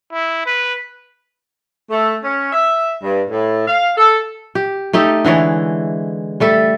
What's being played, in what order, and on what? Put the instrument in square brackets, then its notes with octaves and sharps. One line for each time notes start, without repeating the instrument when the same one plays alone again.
[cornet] E4
B4
[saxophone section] A3
C#4
E5
G2
A2
F5
A4
[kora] G4
A3 D#4 G4 A4
D3 E3 G#3 C#5
G3 A3 A4